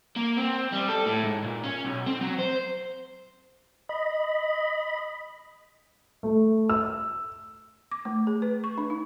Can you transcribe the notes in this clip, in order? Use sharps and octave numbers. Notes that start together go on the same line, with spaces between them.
A#3
C4
G3
A4
A2
G#2
A#2
C#4
B1
C4
F#3
C5
D#5 B5
A3
E6
D6
A3
G#4
B4
C#6
D4
D#4